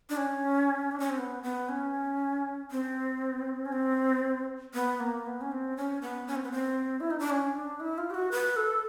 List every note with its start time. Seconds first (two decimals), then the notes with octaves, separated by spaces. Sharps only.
0.10 D4
0.17 C#4
0.92 D4
1.00 C#4
1.10 C4
1.18 B3
1.43 B3
1.69 C#4
2.71 C4
3.65 C#4
3.72 C4
4.74 B3
5.00 A#3
5.26 B3
5.41 C#4
5.52 C4
5.77 C#4
6.02 B3
6.27 C#4
6.36 C4
6.43 B3
6.52 C4
7.00 E4
7.10 D#4
7.19 D4
7.30 C#4
7.55 D4
7.80 E4
7.98 F4
8.10 G4
8.14 F#4
8.32 B4
8.56 A4